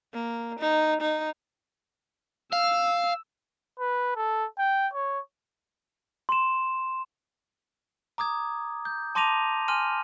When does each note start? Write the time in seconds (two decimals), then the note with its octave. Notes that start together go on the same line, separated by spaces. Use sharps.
0.14 A#3
0.59 D#4
1.01 D#4
2.53 F5 E6
3.80 B4
4.16 A4
4.58 G5
4.93 C#5
6.29 C6 E7
8.18 A#5 D6 D#6 G#6
8.85 G6
9.15 A5 C6 D6 A#6 D#7 F7
9.68 G#5 C6 F6 D#7